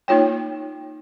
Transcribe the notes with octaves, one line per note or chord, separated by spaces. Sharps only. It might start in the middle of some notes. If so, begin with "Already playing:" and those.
A#3 D#4 F4 C#5 G5